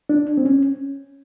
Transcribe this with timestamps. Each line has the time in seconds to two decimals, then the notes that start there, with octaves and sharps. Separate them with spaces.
0.09 D4
0.37 C4
0.45 C#4